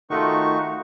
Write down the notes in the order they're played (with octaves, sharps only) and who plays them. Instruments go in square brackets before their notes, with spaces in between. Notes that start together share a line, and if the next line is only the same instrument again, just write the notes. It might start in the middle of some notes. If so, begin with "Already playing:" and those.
[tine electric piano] D#3 A3 F4 [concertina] D#4 F#4 C#6